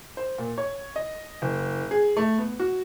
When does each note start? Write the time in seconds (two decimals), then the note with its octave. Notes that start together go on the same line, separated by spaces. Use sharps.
0.17 C5
0.38 A#2
0.58 C#5
0.96 D#5
1.42 F#1
1.91 G#4
2.17 A3
2.38 B3
2.59 F#4